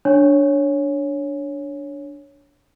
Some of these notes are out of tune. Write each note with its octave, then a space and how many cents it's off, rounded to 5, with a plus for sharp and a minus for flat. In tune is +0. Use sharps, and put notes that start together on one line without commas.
D4 -10 C#5 +0 G#5 +0